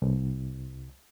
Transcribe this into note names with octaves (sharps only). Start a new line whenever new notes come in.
C2